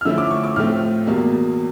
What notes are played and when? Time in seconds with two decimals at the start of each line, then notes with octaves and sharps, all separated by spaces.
0.01 F6
0.05 D3 F3 A3 C#4 E4 E6
0.18 D6
0.31 C#6
0.44 D6
0.56 A2 F3 A3 C4 F6
1.07 E2 B2 G3 A#3